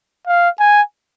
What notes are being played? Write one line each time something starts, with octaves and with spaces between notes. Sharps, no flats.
F5
G#5